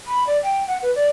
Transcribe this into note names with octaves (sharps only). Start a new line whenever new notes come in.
B5
D5
G5
F#5
B4
D5